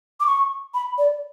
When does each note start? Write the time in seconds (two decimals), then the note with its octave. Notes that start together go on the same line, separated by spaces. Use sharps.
0.20 D6
0.26 C#6
0.74 B5
0.98 D5